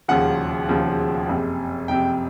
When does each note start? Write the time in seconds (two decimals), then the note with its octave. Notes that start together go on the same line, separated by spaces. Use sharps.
0.08 E1 D#2 C#3 F3 F#5
0.69 E1 D#2 C#3 F3
1.28 F#1 F2 C3
1.88 F#1 F2 C3 G5